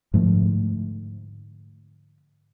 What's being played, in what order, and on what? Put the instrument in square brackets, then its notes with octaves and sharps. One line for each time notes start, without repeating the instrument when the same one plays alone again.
[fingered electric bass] G#2 D3 F3 A3